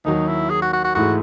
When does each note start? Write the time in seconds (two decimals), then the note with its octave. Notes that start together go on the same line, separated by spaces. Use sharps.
0.05 D#2 D#3 F#3 D#4
0.27 E4
0.50 G#4
0.62 F#4
0.73 F#4
0.84 F#4
0.95 G#2 E3 A3 E4 F#4 G#4